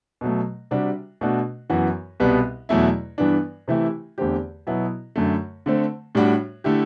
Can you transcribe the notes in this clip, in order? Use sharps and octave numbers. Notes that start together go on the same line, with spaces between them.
B2 F#3 A3
C3 G3 D4 F#4
B2 A3 D4 F#4
F#2 E3 B3 F#4
C2 B2 G3 B3
E2 B2 F#3 A3 E4
G2 E3 B3 D4
C3 E3 A3 E4 G4
E2 D3 A3 C4 G4
B2 F#3 B3 E4
F#2 D3 A3
D3 A3 C4
A2 G3 D4 F#4
D3 A3 E4 G4